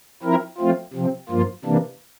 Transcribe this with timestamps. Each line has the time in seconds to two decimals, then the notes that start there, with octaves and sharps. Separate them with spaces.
0.23 F3 C4 E4 A#4
0.58 F3 A3 C4 F4
0.94 C3 F3 C4
1.29 G2 F3 A#3 F4
1.64 C3 E3 A#3 D4